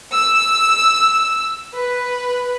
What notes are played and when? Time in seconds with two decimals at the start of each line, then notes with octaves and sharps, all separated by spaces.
0.13 E6
1.77 B4